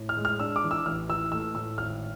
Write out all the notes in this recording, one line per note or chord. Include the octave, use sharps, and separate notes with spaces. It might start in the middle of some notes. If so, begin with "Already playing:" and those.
Already playing: A2
F6
G#3
F6
D4 E6
D6
E3
E6
A1 F6
E3 E6
A3 E6
A2 E6
G#1 F6